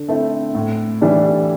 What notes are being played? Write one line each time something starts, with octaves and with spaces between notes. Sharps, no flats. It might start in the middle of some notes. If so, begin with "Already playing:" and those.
Already playing: D3
A3 C4 E4 A4
A2
E3 G3 D4